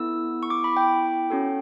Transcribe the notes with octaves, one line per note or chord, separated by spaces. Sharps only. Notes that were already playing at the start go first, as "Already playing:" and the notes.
Already playing: B3 E4 A4 E6
C#6
D6
B5
G5
C#4 F#4 A4